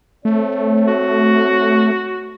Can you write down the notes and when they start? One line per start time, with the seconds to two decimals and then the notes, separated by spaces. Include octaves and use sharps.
0.25 A3 C4 C#5
0.88 F#4